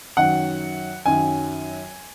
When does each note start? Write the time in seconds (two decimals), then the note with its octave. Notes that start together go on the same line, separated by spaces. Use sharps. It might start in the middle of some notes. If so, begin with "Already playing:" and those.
0.17 F#2 D#3 F#3 F#5
1.06 F#2 D#3 F#3 G#5